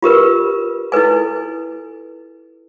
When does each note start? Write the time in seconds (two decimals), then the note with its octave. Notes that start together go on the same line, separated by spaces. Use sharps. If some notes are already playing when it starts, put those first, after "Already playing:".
0.03 F4 G4 A#4 B4
0.92 E4 A4 B4 G#5